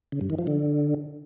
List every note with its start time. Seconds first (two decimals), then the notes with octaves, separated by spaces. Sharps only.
0.12 C#3
0.21 G2
0.30 D#3
0.38 F3
0.47 D3